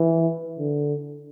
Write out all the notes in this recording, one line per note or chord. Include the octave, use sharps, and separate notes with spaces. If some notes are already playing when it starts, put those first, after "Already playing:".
Already playing: E3
D3